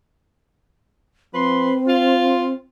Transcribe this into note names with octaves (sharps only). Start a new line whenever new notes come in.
F3 C4 B4 C6
F4